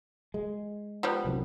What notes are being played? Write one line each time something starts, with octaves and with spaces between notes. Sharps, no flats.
G#3
F3 G3 B3
F1 C2 F#2